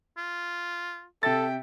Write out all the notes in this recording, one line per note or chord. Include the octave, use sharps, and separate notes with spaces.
F4
C3 A4 E5 G5 A6